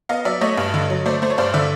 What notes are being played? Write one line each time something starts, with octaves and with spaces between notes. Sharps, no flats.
B3 D#5 F5
F#3 D5 E5
A3 C#5 D#5
G2
D3
F#3
A3 C5 D5
A3 C5
C#5
G2 C5 D5
D3 D5 E5